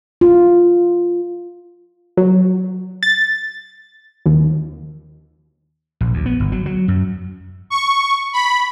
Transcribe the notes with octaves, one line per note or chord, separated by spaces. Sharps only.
F4
F#3
A6
D#2
A#1
D2
B3
G1
F#3
F#3
F#2
C#6
B5